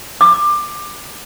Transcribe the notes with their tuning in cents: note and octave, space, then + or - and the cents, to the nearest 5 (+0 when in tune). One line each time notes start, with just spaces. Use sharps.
D6 +20